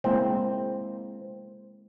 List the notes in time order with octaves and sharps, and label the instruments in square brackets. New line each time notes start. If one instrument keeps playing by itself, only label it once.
[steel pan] G#3 A#3 E4 [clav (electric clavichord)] C4